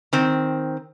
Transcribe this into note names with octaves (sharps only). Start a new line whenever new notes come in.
D#3 C4